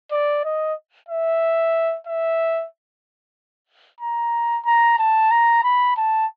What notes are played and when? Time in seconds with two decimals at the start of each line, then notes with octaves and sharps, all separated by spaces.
0.11 D5
0.44 D#5
1.09 E5
2.06 E5
4.00 A#5
4.66 A#5
4.98 A5
5.31 A#5
5.63 B5
5.96 A5